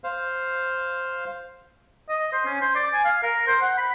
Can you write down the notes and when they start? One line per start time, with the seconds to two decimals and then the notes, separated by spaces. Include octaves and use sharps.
0.04 C5 F5
2.09 D#5
2.33 C5
2.45 C#4
2.61 C5
2.76 D5
2.94 G#5
3.05 F5
3.23 A#4
3.47 C5
3.61 F#5
3.78 B5